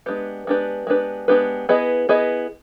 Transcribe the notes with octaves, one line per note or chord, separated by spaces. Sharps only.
G#3 B3 D4 G4 B4
G#3 B3 D4 G4 B4
G#3 B3 D4 G4 B4
G#3 B3 D4 G4 B4
B3 E4 G#4 B4 D#5
B3 E4 G#4 B4 D#5